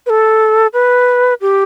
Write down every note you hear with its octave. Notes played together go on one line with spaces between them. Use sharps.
B4
A4
B4
G4